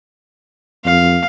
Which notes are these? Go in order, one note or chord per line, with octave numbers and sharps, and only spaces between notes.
F2 F5